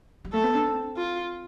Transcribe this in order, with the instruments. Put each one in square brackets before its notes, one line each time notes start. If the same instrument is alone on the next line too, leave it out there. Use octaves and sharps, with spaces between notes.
[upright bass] G3
[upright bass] A3 [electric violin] A4
[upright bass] B3
D4
C4
[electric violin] F4